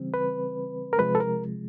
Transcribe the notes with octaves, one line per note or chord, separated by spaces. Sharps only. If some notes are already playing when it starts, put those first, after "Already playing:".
Already playing: C#3 E3 G3 C4
B4
A#4
C3 F3 G#3 B4
A4
A#4